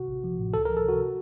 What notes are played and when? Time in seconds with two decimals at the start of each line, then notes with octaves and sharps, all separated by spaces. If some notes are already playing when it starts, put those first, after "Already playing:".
Already playing: C3 F#4
0.08 A1
0.24 F3
0.38 A2
0.54 C#2 A4
0.65 A#4
0.69 F3
0.77 A4
0.85 C3 F#4